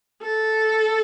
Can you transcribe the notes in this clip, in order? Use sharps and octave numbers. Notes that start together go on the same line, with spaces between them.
A4